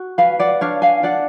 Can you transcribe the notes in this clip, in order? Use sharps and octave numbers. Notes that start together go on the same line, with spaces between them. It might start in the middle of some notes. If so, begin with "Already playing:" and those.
Already playing: F#4
B4 F5 G#5
D5 F#5
D4 C#5 F5
F5 G#5
D4 D5 F#5